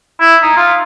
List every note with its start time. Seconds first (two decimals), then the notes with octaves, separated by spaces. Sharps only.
0.21 E4
0.43 D#4
0.57 F4